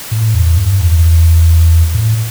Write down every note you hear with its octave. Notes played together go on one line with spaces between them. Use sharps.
A2
E2
G2
E2
A2